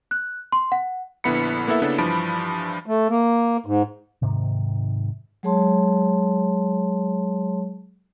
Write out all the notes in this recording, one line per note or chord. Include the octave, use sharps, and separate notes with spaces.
F#6
C6
F#5
A#1 D3 B3 E4 B5 C#7
A#3 B3 E4 A4 E5
C#3 A#3 B3 D4 E4 A4
G2 E3 F3 A5 B5 D7
A3
A#3
G#2
G#2 C3 D#3
F#3 G#3 G#4 C#5 A5 C6